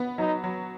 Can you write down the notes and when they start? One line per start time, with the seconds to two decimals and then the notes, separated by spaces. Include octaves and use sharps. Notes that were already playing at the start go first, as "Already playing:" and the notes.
Already playing: B3
0.18 F#3 D#4
0.44 F#3